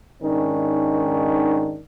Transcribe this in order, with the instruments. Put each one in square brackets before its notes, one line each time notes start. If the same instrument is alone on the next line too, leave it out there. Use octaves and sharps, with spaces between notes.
[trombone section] G#2 D#3 C#4 D4